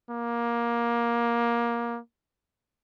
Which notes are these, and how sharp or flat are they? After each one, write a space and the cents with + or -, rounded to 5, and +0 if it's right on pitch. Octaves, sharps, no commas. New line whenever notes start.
A#3 +15